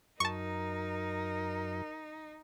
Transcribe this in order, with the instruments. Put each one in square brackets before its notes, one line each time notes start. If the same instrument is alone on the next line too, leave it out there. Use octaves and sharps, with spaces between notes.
[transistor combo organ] F#2 [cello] D#4 [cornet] A#4 [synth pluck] A5 C#6